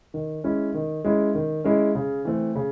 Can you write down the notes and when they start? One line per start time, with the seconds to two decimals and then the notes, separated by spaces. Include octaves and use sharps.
0.14 D#3
0.44 G#3 C#4 E4
0.74 D#3
1.04 G#3 C#4 E4
1.35 D#3
1.64 G#3 C#4 E4
1.95 C#3
2.25 E3 A3 C4
2.56 C#3